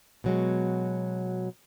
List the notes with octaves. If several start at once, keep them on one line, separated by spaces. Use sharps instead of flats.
B2 F#3 G#3